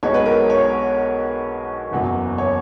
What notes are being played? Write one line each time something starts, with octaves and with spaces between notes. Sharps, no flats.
B1 B2 G#3 B3 D#4 C#5
B4
A#4
C#5
F#1 E2 B2 F#3
C#5